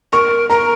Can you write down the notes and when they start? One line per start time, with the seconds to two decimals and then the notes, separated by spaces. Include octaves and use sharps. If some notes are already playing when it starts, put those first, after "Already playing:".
0.13 A#4 C#6
0.50 A#4 A#5